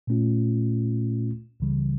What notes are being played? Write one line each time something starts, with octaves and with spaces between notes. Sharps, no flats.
A#2 A3 C#4 F4
C#2 C#3 E3 G3